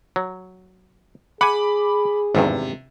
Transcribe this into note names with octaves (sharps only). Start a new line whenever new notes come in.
F#3
G#4 F#5 G#5 B5 D6
G#1 E2 G2 C3